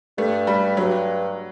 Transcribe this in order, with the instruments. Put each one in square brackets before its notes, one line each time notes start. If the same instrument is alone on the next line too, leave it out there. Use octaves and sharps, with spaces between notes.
[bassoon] G2 [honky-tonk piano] A3
[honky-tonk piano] G3
[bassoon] G2 [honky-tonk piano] F#3